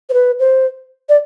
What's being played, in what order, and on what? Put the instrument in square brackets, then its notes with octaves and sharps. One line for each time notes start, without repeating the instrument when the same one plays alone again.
[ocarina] C5
B4
C5
D5